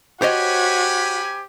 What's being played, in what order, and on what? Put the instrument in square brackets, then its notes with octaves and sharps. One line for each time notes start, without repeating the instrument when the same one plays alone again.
[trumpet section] C#4 G#5 B5 [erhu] F#4 [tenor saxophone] G4 [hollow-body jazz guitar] C5 C#5 D#5